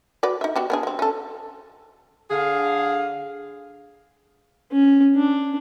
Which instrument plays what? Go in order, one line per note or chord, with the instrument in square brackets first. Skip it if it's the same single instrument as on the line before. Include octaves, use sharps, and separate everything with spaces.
[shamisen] F#4 B4 D5
D#4 E5
B3 F#4 G4
B3 D4 G#4
F#3 C4
C#4 A4
[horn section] D3 G#4 F5
[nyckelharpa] C#4
D4